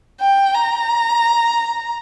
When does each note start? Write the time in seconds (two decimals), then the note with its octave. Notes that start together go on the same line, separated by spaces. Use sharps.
0.21 G5
0.54 A#5